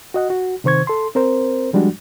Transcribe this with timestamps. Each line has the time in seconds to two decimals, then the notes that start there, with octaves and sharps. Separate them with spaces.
0.14 F#4 D#5 F#5
0.30 F#4
0.64 C3 D#3 C5 C#6 G#6
0.87 A4 C6
1.15 C4 A#4 C5
1.73 F3 G3 G#3 D4 F#4